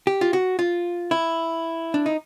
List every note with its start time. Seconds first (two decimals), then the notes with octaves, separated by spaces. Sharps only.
0.07 G4
0.21 F4
0.33 F#4
0.59 F4
1.11 E4
1.94 D4
2.06 D#4